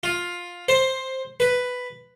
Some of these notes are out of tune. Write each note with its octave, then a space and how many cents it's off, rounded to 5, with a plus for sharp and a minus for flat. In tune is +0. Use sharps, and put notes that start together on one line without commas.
F4 +10
C5 +10
B4 +5